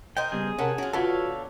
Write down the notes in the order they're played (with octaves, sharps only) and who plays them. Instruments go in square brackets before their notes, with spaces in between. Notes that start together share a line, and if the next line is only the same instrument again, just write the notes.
[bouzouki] A#4 C5 D#5 [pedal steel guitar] G5
[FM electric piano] C#3 G3 B3 [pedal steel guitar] G#4
[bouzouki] C3 F#5 A5 [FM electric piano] C#4 A#4
[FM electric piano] C#4 [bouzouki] F4 F#4
[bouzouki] D3 B3 [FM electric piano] F4 F#4 B4 [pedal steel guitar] A4 C#5 F5